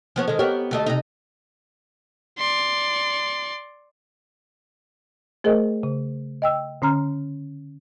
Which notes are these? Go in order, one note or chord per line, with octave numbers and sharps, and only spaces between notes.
F3 B3 C#5
D#3 G#3 A4 D#5
B3 G4 A#4 C#5
D2 A3 D#5
C3 D#4
D5 C6
A3 G#4 A#4 C5 D#5
C#3
D#5 G5 E6
D3 C#4 A#5 F6